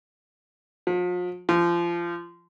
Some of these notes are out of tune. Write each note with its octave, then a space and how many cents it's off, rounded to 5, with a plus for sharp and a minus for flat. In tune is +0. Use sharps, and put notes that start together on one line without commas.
F3 +40
F3 -25